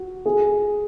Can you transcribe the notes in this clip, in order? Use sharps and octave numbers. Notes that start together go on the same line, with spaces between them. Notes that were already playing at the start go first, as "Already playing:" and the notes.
Already playing: F#4
G#4